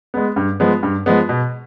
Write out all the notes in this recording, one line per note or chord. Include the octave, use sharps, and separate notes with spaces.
G#3 B3
G2
F3 G#3 B3
G2
F3 G#3 B3
B2